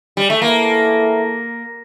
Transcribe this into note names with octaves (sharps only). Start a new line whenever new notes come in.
G3
A3
E2 E3 A3 A#3 E4 A4